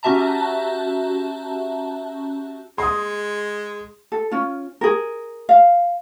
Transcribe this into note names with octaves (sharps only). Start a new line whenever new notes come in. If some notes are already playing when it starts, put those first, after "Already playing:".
C#4 F#4 G4 E5 A5 A#5
G#3 C6 D#6
A4
C#4 F4
G#4 A#4
F5